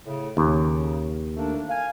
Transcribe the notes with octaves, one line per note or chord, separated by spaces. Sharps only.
A2 C#3
D#2 C#3
A3 A#3 D4
F5 G#5